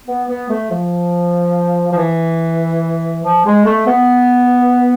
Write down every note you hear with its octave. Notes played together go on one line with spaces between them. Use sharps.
B3
B3
A3
F3
F3
E3
F3
G#3
A3
B3